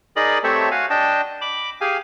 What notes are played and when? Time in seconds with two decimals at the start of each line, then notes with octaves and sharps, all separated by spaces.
0.16 D#4 G#4 A#4 D5 D#5 B5
0.44 A3 C4 G4 A4 C#5 E5
0.71 F#4 F5 G#5
0.90 D4 D#5 G5 A5
1.41 B5 D6
1.81 G4 G#4 F5 G#5